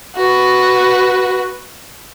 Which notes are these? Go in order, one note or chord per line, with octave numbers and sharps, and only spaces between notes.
F#4 B4